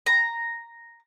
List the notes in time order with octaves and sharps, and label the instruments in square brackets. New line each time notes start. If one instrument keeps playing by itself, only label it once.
[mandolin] A#5